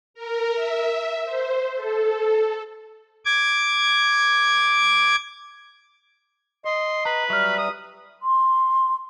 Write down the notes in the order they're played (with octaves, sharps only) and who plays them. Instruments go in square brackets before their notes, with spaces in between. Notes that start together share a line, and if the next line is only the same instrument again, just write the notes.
[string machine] A#4
E5
C5
A4
[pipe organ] D6 G#6
[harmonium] D#5 [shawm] C6
[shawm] B4 [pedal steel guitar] A#5
[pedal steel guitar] F#3 F6 [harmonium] G3 E5 A#5
[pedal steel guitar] B4 [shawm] D#6
[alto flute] C6